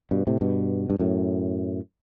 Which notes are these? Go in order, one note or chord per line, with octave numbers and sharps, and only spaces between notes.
G2 B2
A2 C3
G2 B2
G2
F#2 A2